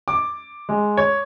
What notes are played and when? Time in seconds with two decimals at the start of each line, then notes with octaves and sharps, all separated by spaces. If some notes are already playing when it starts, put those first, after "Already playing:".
0.08 D6
0.69 G#3
0.97 C#5